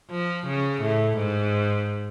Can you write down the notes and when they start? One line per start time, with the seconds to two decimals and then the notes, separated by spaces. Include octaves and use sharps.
0.11 F3
0.46 C#3
0.82 A2
1.17 G#2